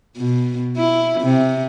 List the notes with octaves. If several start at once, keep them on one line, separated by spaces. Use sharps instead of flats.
B2
E4
C3